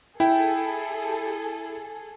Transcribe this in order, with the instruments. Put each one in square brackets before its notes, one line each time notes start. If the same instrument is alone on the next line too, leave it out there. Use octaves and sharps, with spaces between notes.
[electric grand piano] E4 [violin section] G#4 A4 [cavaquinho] G5